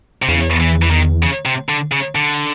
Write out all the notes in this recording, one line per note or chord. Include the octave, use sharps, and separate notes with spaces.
C3
E2 C#3
E3
E3
D#3
C#3
C3
D3
C#3
D3